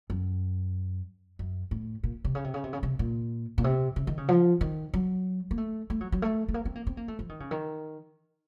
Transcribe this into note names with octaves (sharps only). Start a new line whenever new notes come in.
F#2
F#2
A2
A#2
C3
C#3
C3
C#3
C3
C#3
C3
A#2
A#2
C3
C#3
D#3
C#3
F3
D#3
F#3
A#3
A3
A3
F#3
F#3
A3
A3
A#3
C4
A#3
C4
A#3
A3
F3
D#3
C#3
D#3